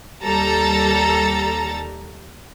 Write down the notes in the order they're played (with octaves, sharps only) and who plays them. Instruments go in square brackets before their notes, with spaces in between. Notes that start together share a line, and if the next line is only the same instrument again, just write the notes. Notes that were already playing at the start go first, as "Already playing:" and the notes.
[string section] D#2 G3 A4 A#5 A6